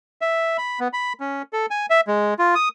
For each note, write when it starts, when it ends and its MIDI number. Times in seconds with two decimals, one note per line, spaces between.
0.21 0.57 76
0.58 0.80 83
0.80 0.88 59
0.93 1.13 83
1.20 1.42 61
1.53 1.66 69
1.70 1.86 80
1.90 2.01 76
2.07 2.34 56
2.39 2.55 65
2.55 2.69 87